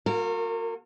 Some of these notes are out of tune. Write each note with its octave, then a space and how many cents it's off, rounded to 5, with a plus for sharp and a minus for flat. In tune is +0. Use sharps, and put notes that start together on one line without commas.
A#3 +0 F#4 -40 A#4 -30